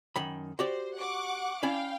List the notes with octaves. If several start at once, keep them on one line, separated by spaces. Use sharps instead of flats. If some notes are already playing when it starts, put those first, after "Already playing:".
F#2 D#3 B5
F#4 G4 C5 D5
F#5 C#6 D6
C#4 E4 D5 F5 G5